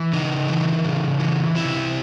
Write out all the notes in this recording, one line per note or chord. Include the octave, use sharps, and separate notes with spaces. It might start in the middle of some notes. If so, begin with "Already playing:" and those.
Already playing: E3
C#3 D#4
E3
C#3
E3
C3 E4